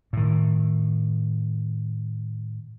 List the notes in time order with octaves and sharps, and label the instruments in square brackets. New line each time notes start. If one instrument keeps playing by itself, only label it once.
[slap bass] A2 D#3